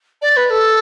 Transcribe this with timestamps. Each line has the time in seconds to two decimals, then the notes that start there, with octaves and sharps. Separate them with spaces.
0.22 D5
0.36 B4
0.50 A4